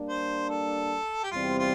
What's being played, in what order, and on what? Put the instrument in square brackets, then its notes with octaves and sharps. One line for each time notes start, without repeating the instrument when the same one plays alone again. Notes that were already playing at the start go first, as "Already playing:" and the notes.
Already playing: [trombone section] G3 A#3 D4
[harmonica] C5
A4
G4
[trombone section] E2 C3 G3 C4 [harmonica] F4
[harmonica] F4